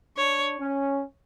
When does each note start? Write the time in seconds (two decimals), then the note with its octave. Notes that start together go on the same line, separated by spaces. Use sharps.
0.17 D4 C#5
0.58 C#4